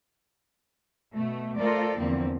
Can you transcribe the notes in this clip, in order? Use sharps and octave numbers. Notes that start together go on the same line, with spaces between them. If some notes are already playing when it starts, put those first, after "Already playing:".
B2 A3
A3 F4 A4 A#4 C5 D5
E2 D3 F3 A#3 C4